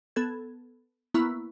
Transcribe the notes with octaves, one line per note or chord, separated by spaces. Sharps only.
B3 A4 G#6
A#3 B3 E4 C#6